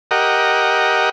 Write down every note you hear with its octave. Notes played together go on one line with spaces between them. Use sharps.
G4 A#4 D#5 F#5